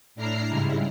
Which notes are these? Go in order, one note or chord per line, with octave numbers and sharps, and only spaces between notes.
A2 D4 E4 A#5 F6 C7
G#2 C#3 G3 G#3 E4